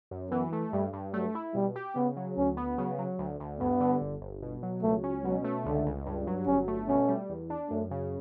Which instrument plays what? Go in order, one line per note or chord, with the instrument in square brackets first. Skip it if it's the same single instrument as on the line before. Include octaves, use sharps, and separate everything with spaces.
[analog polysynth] F#2
[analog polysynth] E3 [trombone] B3
[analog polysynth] A3
[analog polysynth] G2 [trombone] G3
[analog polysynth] G2
[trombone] F#3 [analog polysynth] A3
[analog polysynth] E4
[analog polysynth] B2 [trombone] G3
[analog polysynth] G4
[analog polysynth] C#3 [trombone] B3
[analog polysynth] F#3
[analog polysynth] D2 [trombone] C#4
[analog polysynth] B3
[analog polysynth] C#3 [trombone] F#3
[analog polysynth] F#3
D2
D2
[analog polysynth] G2 [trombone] B3
[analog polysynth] D3
G1
G1
B2
F#3
[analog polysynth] C#2 [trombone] A3
[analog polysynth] C#4
[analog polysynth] B2 [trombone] F#3
[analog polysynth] A3
[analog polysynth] C#2 [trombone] D3
[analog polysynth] C#2
G2
F#3
[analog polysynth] G1 [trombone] C#4
[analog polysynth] A3
[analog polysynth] B2 [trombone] C#4
[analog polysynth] G3
E2
D4
[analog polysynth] F#2 [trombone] A3
[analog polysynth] C#3